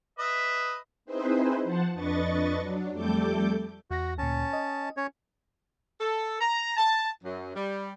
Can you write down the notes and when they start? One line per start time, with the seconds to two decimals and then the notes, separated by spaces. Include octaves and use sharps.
0.19 B4 D#5 E5
1.05 C4 D#4 E4 G#4 B4 C5
1.64 F3 C5 F#5 A5
1.94 F2 D4 B4 D#5 C#6 A6
2.60 F#3 D4
2.91 F2 G3 A3 A4 D6 G6
3.91 E2 F#4 A#6
4.18 D2 A#2 C#4 A5
4.53 D#5
4.97 C#4 C#5
6.01 A4
6.41 A#5
6.77 A5
7.24 F#2
7.55 G3